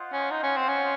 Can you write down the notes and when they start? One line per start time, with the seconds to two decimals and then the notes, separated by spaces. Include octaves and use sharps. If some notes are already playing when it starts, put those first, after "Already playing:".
Already playing: F4 C5 D#5 F#5
0.12 C#4
0.31 D#4
0.43 C#4
0.57 C4
0.69 C#4